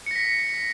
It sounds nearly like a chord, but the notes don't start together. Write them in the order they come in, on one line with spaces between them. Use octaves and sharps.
C#7 A#6 B6